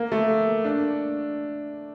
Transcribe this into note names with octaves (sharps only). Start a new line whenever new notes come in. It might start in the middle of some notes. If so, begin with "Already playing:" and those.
Already playing: A#3
A3
D4